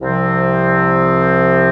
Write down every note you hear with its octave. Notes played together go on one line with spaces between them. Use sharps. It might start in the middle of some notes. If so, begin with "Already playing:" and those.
C2 C3 F3 C4